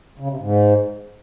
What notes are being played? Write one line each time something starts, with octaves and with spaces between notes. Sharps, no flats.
C#3
C3
G#2